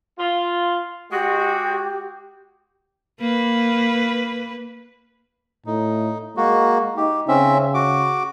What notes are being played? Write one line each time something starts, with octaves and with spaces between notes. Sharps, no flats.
F4
G#3 F#4 G4
A#3 B4
A2 D#4
G#3 A#3 F#4
D#4 G4
C#3 C4 C#4 E5
F#4 D6